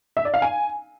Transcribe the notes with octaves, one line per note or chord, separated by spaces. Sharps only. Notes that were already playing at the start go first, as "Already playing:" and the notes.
E5
D5
F5
G#5